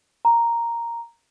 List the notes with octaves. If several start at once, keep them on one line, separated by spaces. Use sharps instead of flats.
A#5